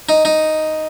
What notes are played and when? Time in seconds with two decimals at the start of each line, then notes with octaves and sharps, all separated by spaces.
0.09 D#4
0.25 D#4